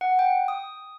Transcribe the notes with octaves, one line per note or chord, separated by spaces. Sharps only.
F#5
G5
D#6